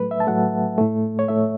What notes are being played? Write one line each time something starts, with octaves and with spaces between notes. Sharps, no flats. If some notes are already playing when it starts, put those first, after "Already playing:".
Already playing: A2 F#3 A3 B4
E5
A5
A2 F#3 A3 F#5
A2 A3
C#5
A2 A3 E5